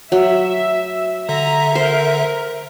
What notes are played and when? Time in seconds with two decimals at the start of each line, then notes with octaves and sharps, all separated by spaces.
0.12 F#3 E5
1.29 D3 E5 A#5
1.75 A#4 C5